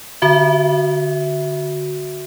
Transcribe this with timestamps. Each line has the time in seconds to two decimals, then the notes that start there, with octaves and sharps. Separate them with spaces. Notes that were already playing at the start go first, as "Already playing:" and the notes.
0.22 D3 F#4 E5